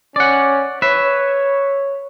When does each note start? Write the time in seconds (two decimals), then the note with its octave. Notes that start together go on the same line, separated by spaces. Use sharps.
0.16 C#4 D5 F#5
0.82 B4 C#5 E5